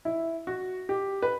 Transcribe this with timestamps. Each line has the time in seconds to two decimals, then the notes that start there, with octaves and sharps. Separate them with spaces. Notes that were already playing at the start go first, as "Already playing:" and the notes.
0.05 E4
0.47 F#4
0.89 G4
1.22 B4